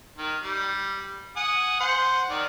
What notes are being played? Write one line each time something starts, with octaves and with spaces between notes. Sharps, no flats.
D#3
G3
F#5 G#5 D#6
C5 F#5
D#3 D5